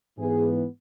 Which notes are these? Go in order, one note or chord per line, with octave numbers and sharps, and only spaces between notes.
G#2 E3 B3 G#4